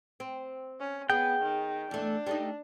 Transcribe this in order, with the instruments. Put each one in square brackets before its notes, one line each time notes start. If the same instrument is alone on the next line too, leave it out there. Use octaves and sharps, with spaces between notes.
[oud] C4
[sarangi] C#4
[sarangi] B3 [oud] G#4 [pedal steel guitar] G5
[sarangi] D#3
[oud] E2 A3 [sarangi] D4
[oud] G3 A3 D#4